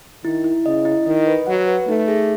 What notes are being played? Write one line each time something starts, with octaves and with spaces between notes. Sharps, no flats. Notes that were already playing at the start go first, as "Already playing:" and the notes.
D#3 E4
E4
C#3 D#5
E4
D#3 D#5
B4
F#3 F#5
B4
A3 D#4
G#4